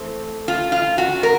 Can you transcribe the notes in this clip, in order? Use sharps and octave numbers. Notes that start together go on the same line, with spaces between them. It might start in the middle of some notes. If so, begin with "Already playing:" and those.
Already playing: E3 A3 C4 A4
F4
F4
F#4
A#4